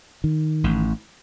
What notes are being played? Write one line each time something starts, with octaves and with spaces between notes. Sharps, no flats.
D#3
A1 A2